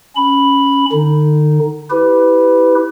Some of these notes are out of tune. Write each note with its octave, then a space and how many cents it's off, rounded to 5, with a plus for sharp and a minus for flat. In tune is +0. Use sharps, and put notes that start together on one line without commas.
C#4 +0 B5 +0
D3 +40 D#4 +0
E4 -10 G4 +0 B4 +20